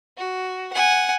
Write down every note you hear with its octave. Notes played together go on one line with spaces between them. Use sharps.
F#4
F#5 G#5